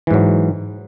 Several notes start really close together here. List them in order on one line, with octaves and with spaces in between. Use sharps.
E3 G#2 F#3